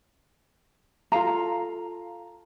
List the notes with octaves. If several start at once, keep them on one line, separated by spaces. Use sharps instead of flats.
F4 A4 F5 A#5